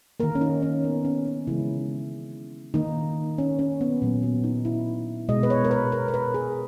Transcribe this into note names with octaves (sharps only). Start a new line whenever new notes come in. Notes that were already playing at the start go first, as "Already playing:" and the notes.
D#3 A#3 A#4
C#4
D#4
C#4
B3
C#4
D#4
C#3 E3 G#3 E4
D#3 A#3 D#4
C#4
C#4
B3
A#2 F#3 A#3
B3
D#4
E4
B2 G#3 D#5
B4
C#5
A#4
B4
A#4
A#4
B4
G#4